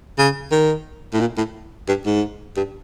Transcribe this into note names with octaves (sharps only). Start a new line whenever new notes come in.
C#3
D#3
A2
A#2
A2
G2
G#2
G2